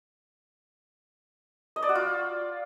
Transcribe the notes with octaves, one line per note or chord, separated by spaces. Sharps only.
D#5
D5
F#4
F4